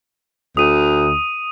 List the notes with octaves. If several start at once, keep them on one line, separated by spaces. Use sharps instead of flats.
D2 D#6 D#7